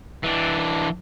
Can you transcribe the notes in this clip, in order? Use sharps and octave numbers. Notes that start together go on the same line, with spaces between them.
E3 D4